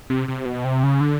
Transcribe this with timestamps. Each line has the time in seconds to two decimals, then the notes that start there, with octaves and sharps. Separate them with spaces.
0.10 C3
0.28 C3
0.45 B2
0.64 C3
0.83 C#3
1.00 D3